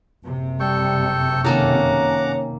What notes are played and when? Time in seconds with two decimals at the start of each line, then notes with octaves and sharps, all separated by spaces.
0.23 F#1 C3
0.60 G3 A4 G5 C#6
1.45 D#3 A#3 C#4 A4 F#5 A#5 D6